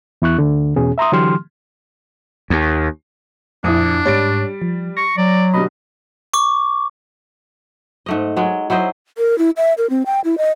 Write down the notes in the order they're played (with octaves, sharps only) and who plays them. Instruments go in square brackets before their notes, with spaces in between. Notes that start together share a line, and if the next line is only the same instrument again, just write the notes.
[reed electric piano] E2 E4 C#6 F#6
D2 D3
E2 B2 C#4 G#4
E5 A#5 C6 D#6
D3 E3 F#3 G4 C6 F6
[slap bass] D#2
[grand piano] A#1 D#6 [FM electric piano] F2 E4 [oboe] D4
[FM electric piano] G#2 C#5 [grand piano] G3 A6 D7
[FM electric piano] F3
[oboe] C#6 [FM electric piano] A#6
[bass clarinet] F#3 [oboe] D5
[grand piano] B2 D3 G3 [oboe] D#5 [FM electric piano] B5
[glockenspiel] C#6 D6
[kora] G#2 A3 D#5
F#3 G#3
F#3 E4 C5 D#5
[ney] A#4
E4
E5
A#4
C4
G5
E4
D#5